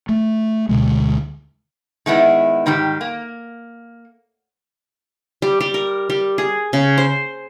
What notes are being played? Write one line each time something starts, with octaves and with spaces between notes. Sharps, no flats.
A3
D2 B2 D3 G#3
D#3 G#3 B3 E4
G#2 D#3 G3 G4
A#3
G3
G3
A#4
G3
G#4
C#3
C5